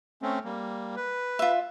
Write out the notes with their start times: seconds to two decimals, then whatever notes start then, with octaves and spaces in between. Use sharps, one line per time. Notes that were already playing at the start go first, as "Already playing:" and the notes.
0.22 A3 C4 C#4
0.45 G3 A#3
0.96 B4
1.39 F4 E5